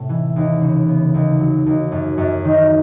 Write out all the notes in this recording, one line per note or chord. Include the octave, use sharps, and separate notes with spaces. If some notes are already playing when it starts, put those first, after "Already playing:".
Already playing: A2 C3
E3
D#2
C#3
B3
D#2
F#3
D#2
F#2
F#2
D#3